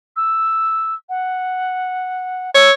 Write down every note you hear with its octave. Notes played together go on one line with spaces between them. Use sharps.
E6
F#5
C#5 E6